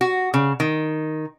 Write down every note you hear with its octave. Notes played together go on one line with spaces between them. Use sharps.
F#4
C#3
D#3